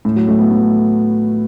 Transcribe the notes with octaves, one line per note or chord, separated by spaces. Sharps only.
A2
F#3
A3
B3
A3